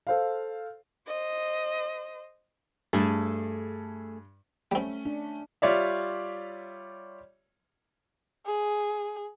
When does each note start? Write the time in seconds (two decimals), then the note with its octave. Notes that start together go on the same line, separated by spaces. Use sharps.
0.07 A4 C5 F5
1.07 C5 D#5
2.93 G2 A3 G#4 A4
4.72 G3 A3 C4 C#4
5.05 D4
5.62 G3 F4 C#5 D5 E5
8.45 G#4